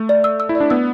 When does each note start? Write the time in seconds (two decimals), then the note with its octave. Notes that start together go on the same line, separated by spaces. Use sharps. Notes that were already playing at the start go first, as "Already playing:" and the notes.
Already playing: A3
0.09 D5
0.24 E6
0.40 E6
0.49 E4
0.55 D5
0.60 D4
0.70 B3 E6